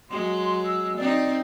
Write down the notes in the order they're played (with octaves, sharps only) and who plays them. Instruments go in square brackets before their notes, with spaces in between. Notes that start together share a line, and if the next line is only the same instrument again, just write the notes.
[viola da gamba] F#3 G#3 [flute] C6
[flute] E6
[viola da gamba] C4 D#4 [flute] D5